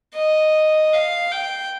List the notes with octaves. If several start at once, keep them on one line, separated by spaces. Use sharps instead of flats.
D#5
F5
G5